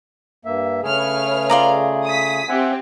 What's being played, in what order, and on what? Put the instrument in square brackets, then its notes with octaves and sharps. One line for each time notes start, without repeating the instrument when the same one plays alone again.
[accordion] G2 A#3 E5
[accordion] C#3 A3 G#4 [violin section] B4 C#5 F6
[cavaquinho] F4 D5 A#5
[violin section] D#6 B6
[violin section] C4 G4 [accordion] E5 F#5 G#5